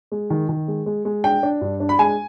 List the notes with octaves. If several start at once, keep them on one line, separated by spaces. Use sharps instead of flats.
G#3
D#3
D#3
G#3
G#3
G#3
D4 G5
D4
G2
D4
B5
G#3 G#5